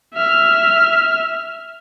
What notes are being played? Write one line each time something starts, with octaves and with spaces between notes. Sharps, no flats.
E5 F6